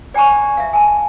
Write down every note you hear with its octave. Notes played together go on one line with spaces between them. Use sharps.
D5 G5 G#5 A#5 C#6
E5 F5
G#5 A5